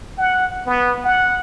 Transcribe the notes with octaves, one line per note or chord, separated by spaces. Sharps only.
F#5
B3
F#5